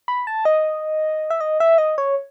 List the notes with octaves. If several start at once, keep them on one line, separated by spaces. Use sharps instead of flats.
B5
A5
D#5
E5
D#5
E5
D#5
C#5